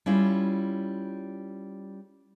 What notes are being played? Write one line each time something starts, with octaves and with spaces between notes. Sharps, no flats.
G3 C#4 E4 F4